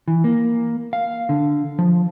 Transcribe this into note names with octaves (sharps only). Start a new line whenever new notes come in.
E3
A#3
F5
D3
F3